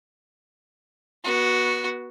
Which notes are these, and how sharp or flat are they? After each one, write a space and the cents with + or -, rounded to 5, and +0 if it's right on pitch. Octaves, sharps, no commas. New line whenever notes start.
B3 -25 F#4 +0